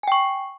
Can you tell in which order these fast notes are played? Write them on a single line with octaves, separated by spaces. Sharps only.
G#5 G5 C#6